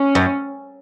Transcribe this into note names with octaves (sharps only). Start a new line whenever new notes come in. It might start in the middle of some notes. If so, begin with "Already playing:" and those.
Already playing: C#4
F#2